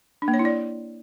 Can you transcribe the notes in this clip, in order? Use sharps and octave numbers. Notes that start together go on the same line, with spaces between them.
D4
A#3
C#5
E4
D5